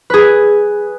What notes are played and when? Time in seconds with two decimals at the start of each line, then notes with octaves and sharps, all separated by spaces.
0.10 G#4 B4